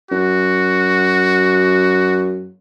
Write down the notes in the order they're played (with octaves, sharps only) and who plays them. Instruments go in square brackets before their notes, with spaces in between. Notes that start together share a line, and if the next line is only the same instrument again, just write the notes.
[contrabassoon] F#2 [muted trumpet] F#4